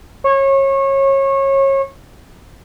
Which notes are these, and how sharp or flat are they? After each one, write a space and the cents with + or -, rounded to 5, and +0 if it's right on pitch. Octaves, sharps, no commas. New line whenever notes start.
C#5 -25